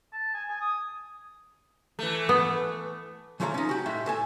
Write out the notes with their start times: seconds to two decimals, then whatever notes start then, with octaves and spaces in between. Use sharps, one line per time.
0.12 A5
0.34 G#5
0.49 G#5
0.61 D#6
1.99 E3 A3
2.29 B3
3.40 E3 A3 F4 C#5 F#5 A#5
3.54 C#4 D#4
3.69 F#4 G4
3.86 A2 G#3 E5
4.06 A2 A4 G#5